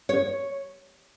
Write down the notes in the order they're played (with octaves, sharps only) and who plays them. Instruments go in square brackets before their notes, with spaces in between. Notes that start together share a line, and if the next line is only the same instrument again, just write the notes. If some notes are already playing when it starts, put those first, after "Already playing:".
[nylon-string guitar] C#5